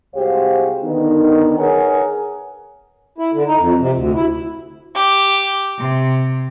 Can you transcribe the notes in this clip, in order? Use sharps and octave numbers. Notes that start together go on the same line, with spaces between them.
C2 G#3 F#4 G4 C5 F5
D3 D#3 B3 D#4
G#4 A#4 B4 C#5 F#5 G#5
E4
D3
D#4
F2
C3
D2
E4
G4
C3